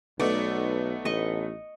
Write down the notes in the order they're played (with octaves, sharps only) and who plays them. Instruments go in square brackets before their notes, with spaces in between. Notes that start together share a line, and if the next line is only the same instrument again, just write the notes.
[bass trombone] B1 [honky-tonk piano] A3 B3 D#4 [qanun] D5
[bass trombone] A1 [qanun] D#5 C#6